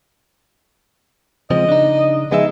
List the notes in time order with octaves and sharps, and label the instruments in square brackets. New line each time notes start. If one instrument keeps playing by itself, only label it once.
[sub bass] C#3 [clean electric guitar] F3 G#3 C4 [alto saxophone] D#5
[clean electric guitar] D4 D#4
[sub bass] F3 [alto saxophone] G#3 [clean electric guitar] B3 D#4 E5